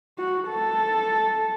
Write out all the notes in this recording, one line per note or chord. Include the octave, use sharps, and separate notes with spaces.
F#4
A4